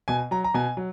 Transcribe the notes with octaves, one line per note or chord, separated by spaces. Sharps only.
B2 G#5
F#3 A#5
A#5
B2 G#5
F#3